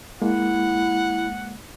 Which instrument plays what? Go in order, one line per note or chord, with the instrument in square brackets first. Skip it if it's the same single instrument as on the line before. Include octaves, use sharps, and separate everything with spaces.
[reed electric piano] G#3 A#3 [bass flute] E4 [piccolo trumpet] F#5